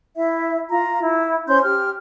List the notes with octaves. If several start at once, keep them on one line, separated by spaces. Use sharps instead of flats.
E4 E5
F4 A#5
E4
C#4 C5 C6 G6
G4 F6